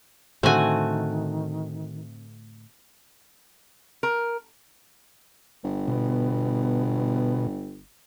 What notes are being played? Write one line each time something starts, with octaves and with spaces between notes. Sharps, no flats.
A2 D3 D#3 A3 C4 F#4 A4 G#5
A#4
G1
B2